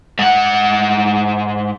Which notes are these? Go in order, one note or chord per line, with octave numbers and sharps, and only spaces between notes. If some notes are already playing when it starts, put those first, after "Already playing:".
G#2 F#5